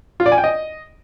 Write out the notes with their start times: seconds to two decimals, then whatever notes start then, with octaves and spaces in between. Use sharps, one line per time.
0.20 F4
0.26 D5
0.32 G#5
0.38 G5
0.44 D#5